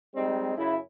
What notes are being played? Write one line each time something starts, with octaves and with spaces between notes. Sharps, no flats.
G3 G#3 C4 D#4
F#2 C#3 E4